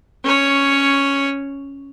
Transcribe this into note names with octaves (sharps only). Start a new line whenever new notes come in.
C#4 C#5